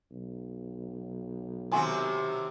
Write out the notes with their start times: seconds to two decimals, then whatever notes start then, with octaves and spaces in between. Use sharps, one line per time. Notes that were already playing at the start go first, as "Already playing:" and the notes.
0.11 B1
1.72 D#2 C3 F#4 A4 G#5 C6